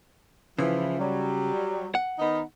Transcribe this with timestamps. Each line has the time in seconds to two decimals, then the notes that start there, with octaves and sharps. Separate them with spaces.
0.58 C#3 E3 F3
0.99 F#3 G3
1.95 F#5
2.19 D#3 B3 D#4